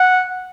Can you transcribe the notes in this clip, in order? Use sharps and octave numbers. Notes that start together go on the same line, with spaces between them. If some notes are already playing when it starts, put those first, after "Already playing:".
Already playing: F#5